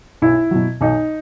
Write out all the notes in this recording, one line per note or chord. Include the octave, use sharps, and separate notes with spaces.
B1 E4
B2 F#3
B1 D#4